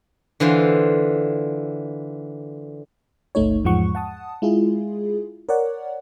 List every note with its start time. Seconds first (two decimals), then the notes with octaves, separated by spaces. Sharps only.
0.40 D3 E3 F4 C5
3.35 G1 C#2 A3 D#4 C#5
3.64 E2 G#2 F3 G#3 F#5 C#6
3.95 F#5 A5 D#6
4.42 G#3 E4 F4 G#4
5.49 A#4 C#5 D5 F#5